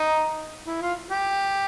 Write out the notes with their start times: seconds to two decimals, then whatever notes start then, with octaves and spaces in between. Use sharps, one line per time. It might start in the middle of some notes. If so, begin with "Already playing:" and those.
Already playing: D#4
0.67 E4
0.82 F4
1.11 G4